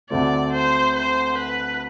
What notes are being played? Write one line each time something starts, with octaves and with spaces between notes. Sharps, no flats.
D2 D3 A3 C4 D5
C5
C5
B4